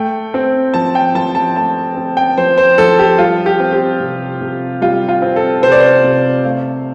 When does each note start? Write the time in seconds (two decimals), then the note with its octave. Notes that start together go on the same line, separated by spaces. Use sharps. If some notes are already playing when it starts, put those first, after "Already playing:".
Already playing: A3 G5
0.34 C4
0.74 F3 A5
0.95 G5
1.15 F3 A5
1.35 A5
1.56 A3 A5
1.97 C4
2.17 G5
2.38 F3 C5
2.58 C5
2.78 F3 A4
2.99 G4
3.18 G3 F4
3.46 G4
3.60 C4
3.73 G4
4.00 C3
4.41 C3
4.81 G3 F4
5.08 F4
5.22 C4
5.36 A4
5.63 C3 C5
5.72 D5
5.80 C5
6.04 C3
6.44 A3 F5